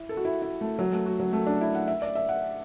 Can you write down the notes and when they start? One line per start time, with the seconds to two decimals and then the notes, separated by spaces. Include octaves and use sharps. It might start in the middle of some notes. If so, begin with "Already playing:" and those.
Already playing: E4
0.09 A4
0.17 F#4
0.25 E4
0.42 E4
0.61 A3
0.79 F#3
0.92 A3
1.06 F#4
1.20 F#3
1.33 A3
1.47 D4
1.61 E4
1.75 F#5
1.88 E5
2.02 D5
2.15 E5
2.29 F#5